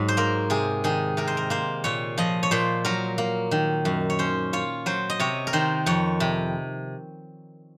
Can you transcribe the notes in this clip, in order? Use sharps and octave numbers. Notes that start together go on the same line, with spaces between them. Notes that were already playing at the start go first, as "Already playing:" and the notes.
Already playing: G#2 F#3
C5
A#3 A#4
C3 G#4
D#3 G#4
C3 A#4
C5
A#4
A#3 C5
A#2 C#5
F3 D#5
C#5
A#2 C5
F#3 A#4
A#3
D#3
F#2
C#5
C#4 C5
F4 C#5
F#3 C5
D#5
C3 C#5
A#4
D#3 C5
F2 C#5
C3